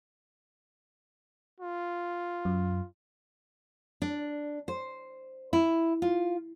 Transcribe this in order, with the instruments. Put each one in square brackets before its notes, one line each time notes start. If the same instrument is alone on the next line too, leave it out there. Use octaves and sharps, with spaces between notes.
[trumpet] F4
[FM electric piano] F#2
[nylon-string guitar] D4
C5
E4
F4